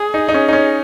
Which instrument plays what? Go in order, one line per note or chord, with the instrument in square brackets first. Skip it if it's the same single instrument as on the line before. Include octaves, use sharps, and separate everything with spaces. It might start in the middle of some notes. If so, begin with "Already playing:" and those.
Already playing: [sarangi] G#4
[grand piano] D#4
D#4
C#4
D#4
C#4